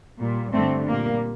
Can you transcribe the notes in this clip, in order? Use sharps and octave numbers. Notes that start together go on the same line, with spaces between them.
A#2 G3
G2 D3 G3 A3 C4
A#2 G3 A#3